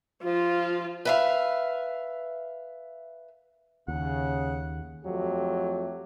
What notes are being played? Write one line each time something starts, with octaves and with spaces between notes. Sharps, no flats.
F3 F4
B4 E5 F5
D#2 C#3 F#5
F2 F#3 A3 G4